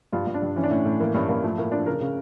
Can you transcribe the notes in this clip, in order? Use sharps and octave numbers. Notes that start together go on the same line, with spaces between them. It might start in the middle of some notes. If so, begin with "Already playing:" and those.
G2 F4
G2
D4
G2
E3 C#4
D4
A2 C#4
A2
E3 A#3
G2 C#4
G2 A#3
F3 A3
A2 A#3
F3 D4
C#3 A#4
C#3